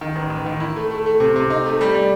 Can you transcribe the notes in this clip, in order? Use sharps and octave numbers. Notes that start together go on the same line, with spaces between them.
D#3
A1
A1
D#3
E4
A3
A3
A3
C3
C3
D#4
A3
G3
G3